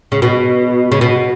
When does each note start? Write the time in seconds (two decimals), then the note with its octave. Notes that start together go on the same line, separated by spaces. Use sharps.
0.12 C#3
0.22 B2
0.92 C#3
1.01 B2